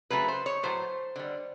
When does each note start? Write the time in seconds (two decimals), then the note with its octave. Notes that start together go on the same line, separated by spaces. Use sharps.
0.10 C#3 F#3 A3 B4
0.28 C5
0.46 C#5
0.63 A2 F#3 A3 C5
1.16 D3 G3